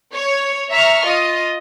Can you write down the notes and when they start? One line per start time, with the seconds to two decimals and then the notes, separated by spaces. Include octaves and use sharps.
0.14 C#5
0.71 E5 A#5 C#6 F6
1.05 F4 D#5